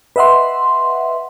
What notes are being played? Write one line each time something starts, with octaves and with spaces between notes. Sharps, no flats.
B4 D#5 E5 F#5 C6